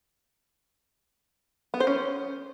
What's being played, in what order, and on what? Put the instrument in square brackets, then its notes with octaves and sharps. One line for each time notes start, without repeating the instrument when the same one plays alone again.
[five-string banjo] B3
C5
C#4